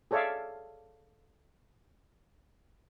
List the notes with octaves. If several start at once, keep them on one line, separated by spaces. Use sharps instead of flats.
G#4 A4 C#5 D5 E5 F5